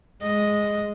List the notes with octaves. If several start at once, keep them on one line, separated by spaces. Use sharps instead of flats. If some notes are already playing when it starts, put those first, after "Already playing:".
G#3 D#5